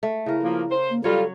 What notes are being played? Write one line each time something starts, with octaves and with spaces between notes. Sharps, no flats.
A3
C#3 E4 A#4
F3 A#3
C5
A#3
F#3 G3 F4 A4 C#5